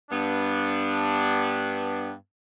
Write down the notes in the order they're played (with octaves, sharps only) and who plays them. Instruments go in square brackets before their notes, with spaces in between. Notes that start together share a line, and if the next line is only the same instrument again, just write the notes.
[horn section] G2 B3 D4